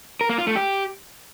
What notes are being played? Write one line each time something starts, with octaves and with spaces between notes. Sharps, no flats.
A#4
A#3
F4
A3
G4